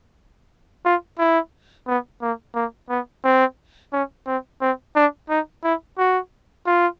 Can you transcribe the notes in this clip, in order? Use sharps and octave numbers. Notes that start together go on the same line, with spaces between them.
F4
E4
B3
A#3
A#3
B3
C4
C#4
C4
C4
D4
D#4
E4
F#4
F4